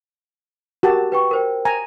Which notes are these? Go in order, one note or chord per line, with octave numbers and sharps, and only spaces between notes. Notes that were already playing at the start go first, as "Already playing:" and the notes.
F#4 G4 A#4 A5
B4 G5 C#6
A#4 C5 G5
G#5 A#5